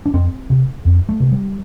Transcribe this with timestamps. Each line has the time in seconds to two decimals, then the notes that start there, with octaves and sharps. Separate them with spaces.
0.06 D4
0.13 F2 C4
0.50 C3
0.85 F2
1.09 A3
1.20 C3
1.31 G3